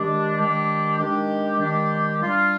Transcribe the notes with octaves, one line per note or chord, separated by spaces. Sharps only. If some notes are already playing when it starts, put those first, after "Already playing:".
Already playing: D#3 G#3 D4 G4
D#3 G#3 D4 G4
D#3 G#3 D4 G4
D#3 G#3 D4 G4
G3 D4 F4